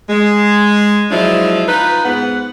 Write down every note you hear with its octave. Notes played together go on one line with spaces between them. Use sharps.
G#3
F3 F#3 G#3 D4 E4
D#4 F4 B4
G#2 B3 B4 F#5